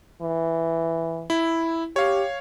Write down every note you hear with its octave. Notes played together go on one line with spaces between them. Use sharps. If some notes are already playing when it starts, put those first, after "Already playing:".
E3
E4
G4 C#5 F5